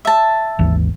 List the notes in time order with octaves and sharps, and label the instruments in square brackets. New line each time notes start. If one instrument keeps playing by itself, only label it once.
[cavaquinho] E5 A5
[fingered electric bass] G#1 D#2 E3